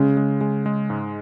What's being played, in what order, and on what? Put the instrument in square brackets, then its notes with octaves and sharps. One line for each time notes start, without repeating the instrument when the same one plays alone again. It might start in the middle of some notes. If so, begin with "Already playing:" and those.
Already playing: [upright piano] C#3 [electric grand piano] G#3
[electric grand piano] G#3
G#3
G#3
G#2